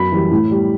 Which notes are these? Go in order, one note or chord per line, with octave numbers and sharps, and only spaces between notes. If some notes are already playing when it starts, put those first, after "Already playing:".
Already playing: F#2 B5
E3 G3
A2
G3